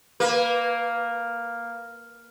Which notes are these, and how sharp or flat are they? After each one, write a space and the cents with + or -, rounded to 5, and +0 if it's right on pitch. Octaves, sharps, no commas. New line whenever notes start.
A#3 +0 B4 -20